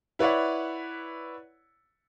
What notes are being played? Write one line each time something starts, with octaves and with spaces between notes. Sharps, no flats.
E4 B4 C#5 D5 F#5